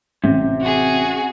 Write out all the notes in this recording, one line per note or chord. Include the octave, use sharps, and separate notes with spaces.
A1 C3
F#4 G#4